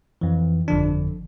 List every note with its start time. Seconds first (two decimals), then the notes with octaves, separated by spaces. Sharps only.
0.21 F2 E3
0.68 G1 F2 D3 F3 D4